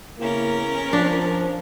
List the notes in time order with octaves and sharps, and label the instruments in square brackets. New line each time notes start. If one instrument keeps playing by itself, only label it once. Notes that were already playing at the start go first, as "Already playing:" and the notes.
[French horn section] C#3 A#3 E4 [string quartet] B3 C#4 A#4
[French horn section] F3 [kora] D4